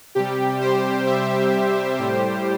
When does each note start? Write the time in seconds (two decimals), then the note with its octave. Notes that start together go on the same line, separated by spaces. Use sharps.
0.15 C3 G3 G4
0.61 G4 C5
1.07 C5 E5
1.97 A2 G3 G4 C5